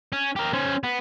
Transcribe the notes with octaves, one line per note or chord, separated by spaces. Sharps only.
C#4
G4 A#4
C#4 C5
B3